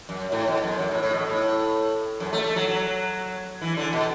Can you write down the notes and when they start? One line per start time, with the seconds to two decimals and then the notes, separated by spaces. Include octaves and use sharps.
0.09 F#2
0.32 A2
0.48 B2
0.64 F#2
0.79 F#2
0.91 A2
1.03 A2
1.14 B2
1.27 A2
2.20 F#2
2.33 A3
2.44 A3
2.56 F#3
2.68 F#3
3.61 E3
3.77 D3
3.93 B2